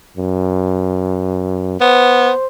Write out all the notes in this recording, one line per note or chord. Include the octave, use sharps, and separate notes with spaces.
F#2
B3 C5